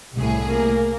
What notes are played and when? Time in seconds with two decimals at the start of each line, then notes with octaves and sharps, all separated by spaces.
0.14 C2 A2 G#4
0.48 A#3 A#4